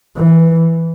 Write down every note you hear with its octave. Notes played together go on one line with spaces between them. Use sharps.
E3